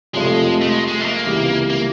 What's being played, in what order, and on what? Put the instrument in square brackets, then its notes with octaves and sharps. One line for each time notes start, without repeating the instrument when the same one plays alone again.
[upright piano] F2 C3 F3 A3 [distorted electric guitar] G#3
[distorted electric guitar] A3
G#3
G#3
A3
A#3
[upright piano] C#2 C3 E3 G3
[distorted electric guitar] A#3